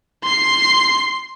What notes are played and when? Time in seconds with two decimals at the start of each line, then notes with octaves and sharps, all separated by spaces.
0.23 C6 C7